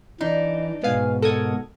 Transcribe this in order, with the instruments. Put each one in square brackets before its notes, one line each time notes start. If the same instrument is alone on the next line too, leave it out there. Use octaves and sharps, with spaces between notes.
[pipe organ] E3 [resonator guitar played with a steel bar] D4 D#4
[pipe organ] G#2 B2 [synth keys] B3 F5 G#5
[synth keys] A4 D#6 G#6 [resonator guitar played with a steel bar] A#4 F#5